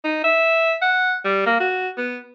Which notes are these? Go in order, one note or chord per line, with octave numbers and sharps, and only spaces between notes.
D#4
E5
F#5
G3
A#3
F#4
B3